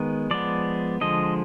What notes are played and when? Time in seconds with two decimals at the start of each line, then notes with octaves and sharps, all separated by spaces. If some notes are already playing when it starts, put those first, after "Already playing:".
Already playing: D#3 G#3 B3
0.31 F3 G#3 B3 D5
1.01 D3 F3 G#3 D#5